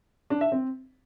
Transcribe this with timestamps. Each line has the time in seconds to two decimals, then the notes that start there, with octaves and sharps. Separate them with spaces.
0.30 D4
0.41 E5
0.52 C4